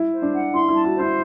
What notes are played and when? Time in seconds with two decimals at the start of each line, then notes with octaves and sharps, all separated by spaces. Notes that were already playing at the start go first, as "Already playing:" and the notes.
Already playing: E4
0.12 C5
0.22 D4
0.33 F#5
0.54 E4 C6
0.68 E4
0.74 A5
0.84 F#4
0.94 C5
0.99 E4